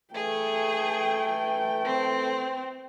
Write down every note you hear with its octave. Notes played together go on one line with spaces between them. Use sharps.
E3 A3 G#4 G5
C4